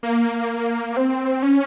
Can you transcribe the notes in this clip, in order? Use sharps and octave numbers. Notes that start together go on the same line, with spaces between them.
A#3
C4
C#4